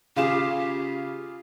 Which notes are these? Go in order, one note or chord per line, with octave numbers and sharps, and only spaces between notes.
C#3 F4 G4 G#4 F5 E7